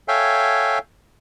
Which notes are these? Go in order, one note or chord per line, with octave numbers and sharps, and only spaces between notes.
A4 C#5 E5 F5 G5 G#5